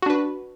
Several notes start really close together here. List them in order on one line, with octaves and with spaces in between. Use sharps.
F#4 D4 B4